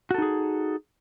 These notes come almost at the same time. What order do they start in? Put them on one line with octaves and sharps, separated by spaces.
F#4 A4 D#4 G#4